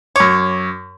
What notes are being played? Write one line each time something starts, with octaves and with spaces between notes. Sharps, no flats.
F#2 C#5 D6